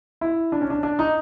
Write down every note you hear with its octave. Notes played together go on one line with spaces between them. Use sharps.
E4
D4
C#4
D4
D4
D#4